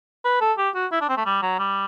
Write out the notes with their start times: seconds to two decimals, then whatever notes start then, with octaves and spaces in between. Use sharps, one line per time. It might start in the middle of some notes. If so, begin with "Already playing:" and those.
0.25 B4
0.41 A4
0.58 G4
0.75 F#4
0.92 E4
1.01 D4
1.09 C4
1.17 A3
1.26 G3
1.43 F#3
1.59 G3